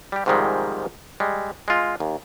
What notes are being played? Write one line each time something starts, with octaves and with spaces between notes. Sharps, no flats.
G3 G4
G#2 C3 D#3 F3 G3 G#3
G3 G#3
G#3 F4
D#2